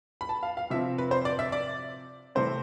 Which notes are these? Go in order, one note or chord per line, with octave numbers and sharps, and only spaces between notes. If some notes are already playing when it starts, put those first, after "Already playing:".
B5
A5
F5
F5
C3 F3 C4 E5
B4
C5
D5
E5
D5
C3 E3 A3 C4 C5